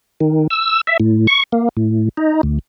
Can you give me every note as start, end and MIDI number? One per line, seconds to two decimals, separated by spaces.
0.20 0.47 51
0.50 0.81 88
0.87 0.97 76
1.00 1.27 45
1.27 1.43 85
1.52 1.69 58
1.77 2.09 45
2.17 2.41 63
2.43 2.59 38